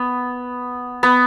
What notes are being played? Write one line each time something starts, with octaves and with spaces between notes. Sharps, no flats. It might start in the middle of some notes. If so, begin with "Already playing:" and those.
Already playing: B3
B3